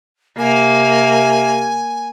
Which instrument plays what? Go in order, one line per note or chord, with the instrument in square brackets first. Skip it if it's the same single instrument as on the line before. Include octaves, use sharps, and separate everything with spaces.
[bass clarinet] C3 [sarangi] A#3 [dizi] G#5